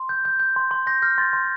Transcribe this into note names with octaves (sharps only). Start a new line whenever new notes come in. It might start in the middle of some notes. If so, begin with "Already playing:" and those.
Already playing: C6
G6
G6
G6
C6
C6
C6 G6 A#6
F6 G6 A#6
C6 A6
C6